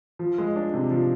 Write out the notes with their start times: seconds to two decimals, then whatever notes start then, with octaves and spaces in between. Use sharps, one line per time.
0.19 F3
0.38 G#3
0.56 D4
0.73 C3
0.91 F3